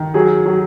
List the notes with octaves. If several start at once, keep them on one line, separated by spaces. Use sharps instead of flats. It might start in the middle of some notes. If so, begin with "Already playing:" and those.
Already playing: D#3
F#3 G#4
F#3